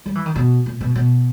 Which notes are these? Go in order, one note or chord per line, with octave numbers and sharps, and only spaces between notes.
G3
E3
D#3
B2
A#2
B2
B2